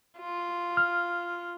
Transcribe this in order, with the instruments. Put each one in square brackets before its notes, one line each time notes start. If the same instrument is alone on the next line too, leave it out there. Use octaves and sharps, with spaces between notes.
[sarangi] F4
[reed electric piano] F6